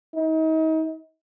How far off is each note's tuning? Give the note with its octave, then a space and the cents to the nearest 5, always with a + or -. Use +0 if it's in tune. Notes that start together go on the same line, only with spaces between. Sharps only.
D#4 +35